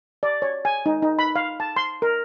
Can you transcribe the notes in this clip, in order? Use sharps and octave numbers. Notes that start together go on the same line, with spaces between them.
D5
C#5
G#5
D#4
D#4
B5
F5
A5
C6
A#4